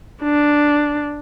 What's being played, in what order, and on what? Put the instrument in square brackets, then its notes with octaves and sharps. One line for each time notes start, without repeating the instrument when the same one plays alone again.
[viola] D4